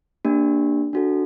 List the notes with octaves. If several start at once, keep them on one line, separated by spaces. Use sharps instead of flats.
A#3 D4 G4
D4 F#4 A4